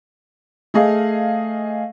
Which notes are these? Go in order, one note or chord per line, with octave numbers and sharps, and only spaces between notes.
A3 G#4 D#5 F5